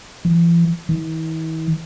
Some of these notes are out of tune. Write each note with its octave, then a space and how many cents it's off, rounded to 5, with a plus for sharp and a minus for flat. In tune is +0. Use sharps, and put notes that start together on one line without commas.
E3 +45
E3 -45